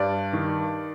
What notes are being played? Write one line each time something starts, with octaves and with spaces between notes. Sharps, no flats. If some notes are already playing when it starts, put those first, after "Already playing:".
Already playing: G2 D5
D#3